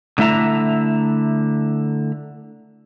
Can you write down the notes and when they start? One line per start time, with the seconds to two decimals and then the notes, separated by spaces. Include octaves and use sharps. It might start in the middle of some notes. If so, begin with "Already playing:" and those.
0.18 D3 A3 E4 E5 A#5